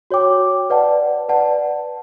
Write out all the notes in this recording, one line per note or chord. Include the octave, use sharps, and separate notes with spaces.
F#4 C#5 G5 D6
B4 D5 F#5 A5
B4 D5 F#5 A5